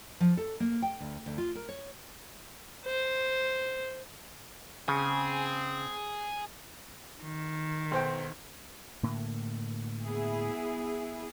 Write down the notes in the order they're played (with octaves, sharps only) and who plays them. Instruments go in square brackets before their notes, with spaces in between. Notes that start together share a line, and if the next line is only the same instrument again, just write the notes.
[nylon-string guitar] F3
A4
A#3
G5
D2
D2
F4
A#4
C#5
[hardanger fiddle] C5
[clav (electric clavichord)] C#3 [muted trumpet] C4 [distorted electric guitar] G#4
[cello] D#3
[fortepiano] B1 C5 G5
[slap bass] A2 D3 A#3
[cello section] B3 E4 G#4